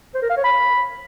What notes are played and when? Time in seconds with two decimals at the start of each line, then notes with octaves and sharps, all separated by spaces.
0.15 C5
0.22 A#4
0.29 F5
0.37 C#5
0.44 B5